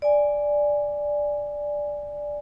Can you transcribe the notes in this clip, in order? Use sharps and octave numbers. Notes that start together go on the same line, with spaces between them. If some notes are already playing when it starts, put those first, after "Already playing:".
D5 G#5